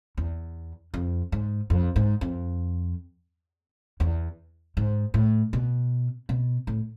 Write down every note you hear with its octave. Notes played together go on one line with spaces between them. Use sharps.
E2
F2
G#2
F2
G#2
F2
E2
G#2
A2
B2
B2
A2